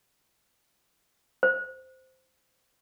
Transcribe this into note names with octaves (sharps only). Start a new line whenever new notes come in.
C5